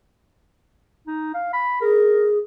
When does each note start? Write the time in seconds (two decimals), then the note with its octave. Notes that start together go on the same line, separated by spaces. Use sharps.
1.07 D#4
1.34 F5
1.53 B5
1.82 G#4 A#4